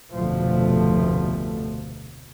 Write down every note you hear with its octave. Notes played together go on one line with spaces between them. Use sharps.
F1 D2 B2 F3 A3